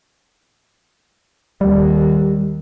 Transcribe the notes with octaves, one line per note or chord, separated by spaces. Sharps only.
D#2 G3